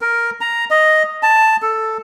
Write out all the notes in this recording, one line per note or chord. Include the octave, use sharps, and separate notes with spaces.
A#4
A#5
D#5
A5
A4